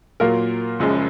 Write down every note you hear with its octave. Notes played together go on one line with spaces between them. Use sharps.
A#2 F#3 A#3 F4 A#4
F#1 F#2 F3 G#3